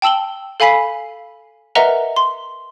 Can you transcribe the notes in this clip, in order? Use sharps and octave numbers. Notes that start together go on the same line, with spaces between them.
G5 A5 E6 F#7 G7
A4 F5 G#5 B5 B6 C7
A#4 B4 D#5 E5 F#5 A#5
C6